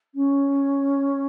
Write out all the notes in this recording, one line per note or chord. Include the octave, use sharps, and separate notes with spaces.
C#4